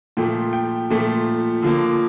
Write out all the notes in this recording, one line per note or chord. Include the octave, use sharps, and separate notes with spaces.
A#2 F3 A3 G5
G5
A#2 F3 A3
D3 F3 A#3